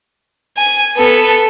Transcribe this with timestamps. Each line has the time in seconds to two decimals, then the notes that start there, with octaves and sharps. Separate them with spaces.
0.57 G#5
0.97 B3 A4